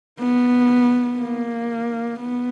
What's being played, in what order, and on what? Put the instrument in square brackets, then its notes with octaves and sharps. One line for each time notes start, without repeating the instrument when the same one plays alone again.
[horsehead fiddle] B3
A#3
B3